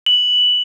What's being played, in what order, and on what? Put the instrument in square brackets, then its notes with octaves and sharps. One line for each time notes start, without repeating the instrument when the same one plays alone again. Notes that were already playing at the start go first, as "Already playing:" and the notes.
[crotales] F#7